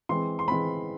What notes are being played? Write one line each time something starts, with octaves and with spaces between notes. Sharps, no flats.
E3 G#3 C4 C6
C6
E3 G#3 C4 B5